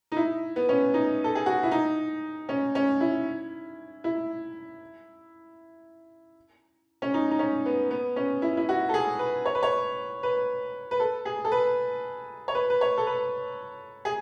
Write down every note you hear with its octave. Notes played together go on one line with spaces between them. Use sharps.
D#4
E4
B3
C#4
D#4
A4
G#4
F#4
E4
D#4
C#4
C#4
E4
E4
C#4
D#4
D#4
C#4
B3
B3
C#4
E4
E4
F#4
A4
G#4
B4
C#5
B4
C#5
B4
B4
A4
G#4
A4
B4
C#5
B4
B4
C#5
A4
B4
G#4